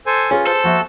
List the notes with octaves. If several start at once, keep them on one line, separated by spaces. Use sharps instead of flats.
A4 C5 G#5
C#4 F4 G#4 B4
A4 C5
F3 A#3 F#4 E5